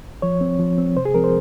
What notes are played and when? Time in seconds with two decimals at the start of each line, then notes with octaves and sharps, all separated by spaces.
0.22 F3 C#5
0.41 C4
0.59 F3
0.78 C4
0.96 C3 C5
1.05 G#4
1.14 F3 C4 A#4
1.24 C5